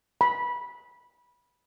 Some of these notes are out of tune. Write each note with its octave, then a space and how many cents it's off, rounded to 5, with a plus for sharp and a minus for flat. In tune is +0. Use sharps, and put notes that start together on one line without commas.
B5 -20